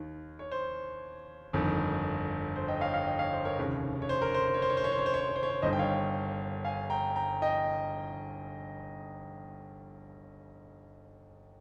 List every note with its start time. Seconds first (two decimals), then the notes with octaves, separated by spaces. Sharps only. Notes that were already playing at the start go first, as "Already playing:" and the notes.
Already playing: D#2 D#3
0.39 C#5
0.51 C5
1.53 G1 F2 D#3
2.56 C5
2.68 D#5 G5
2.81 C#5 F5
2.89 G5
2.94 C#5 F5
3.07 D#5 G5
3.19 C#5 F5
3.33 C5
3.45 A#4 C#5
3.58 F1 D#2 C#3
4.02 C#5
4.09 C5
4.22 A#4
4.34 C5
4.48 C5
4.54 C#5
4.62 C5
4.70 C#5
4.77 C5
4.84 C#5
4.92 C5
4.98 C#5
5.06 C5
5.14 C#5
5.20 C5
5.28 C#5
5.36 C5
5.43 C#5
5.50 C5
5.62 G1 G2 D#3 C5 D#5
5.73 G5
5.79 C#5 F5
6.64 F5 G#5
6.90 G5 A#5
7.15 G5 A#5
7.42 D#5 G5